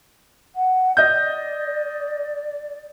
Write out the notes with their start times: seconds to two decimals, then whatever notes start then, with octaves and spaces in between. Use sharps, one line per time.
0.55 F#5
0.97 D5 D#5 G6